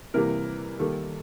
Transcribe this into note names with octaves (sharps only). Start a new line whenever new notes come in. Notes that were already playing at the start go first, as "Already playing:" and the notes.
C3 E3 G3 A#3 A#4
D#3 G3 A#3 A4